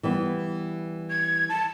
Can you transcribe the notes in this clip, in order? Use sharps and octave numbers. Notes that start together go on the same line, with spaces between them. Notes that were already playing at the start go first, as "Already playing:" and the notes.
E3 G3 B3
G#6
A5